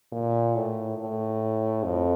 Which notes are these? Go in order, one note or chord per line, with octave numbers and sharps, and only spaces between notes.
A#2
A2
A2
F2